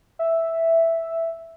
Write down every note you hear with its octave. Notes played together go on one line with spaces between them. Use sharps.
E5